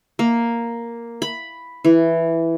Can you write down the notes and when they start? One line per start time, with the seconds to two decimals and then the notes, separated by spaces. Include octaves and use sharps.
0.19 A#3
1.22 B5
1.85 E3